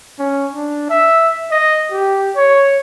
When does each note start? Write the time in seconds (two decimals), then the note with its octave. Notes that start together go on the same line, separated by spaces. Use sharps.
0.19 C#4
0.53 D4
0.90 E5
1.51 D#5
1.92 G4
2.36 C#5